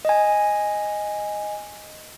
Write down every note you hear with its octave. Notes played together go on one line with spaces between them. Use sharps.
D#5 G#5